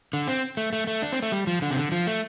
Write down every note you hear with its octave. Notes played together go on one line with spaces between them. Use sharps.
D3
C4
A3
A3
A3
D4
C4
A3
G3
F3
D3
C3
D3
F3
A3